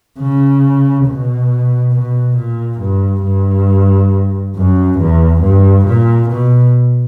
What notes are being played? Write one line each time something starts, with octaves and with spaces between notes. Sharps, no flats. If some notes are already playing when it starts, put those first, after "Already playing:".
C#3
B2
B2
A#2
G2
G2
F#2
E2
G2
A#2
B2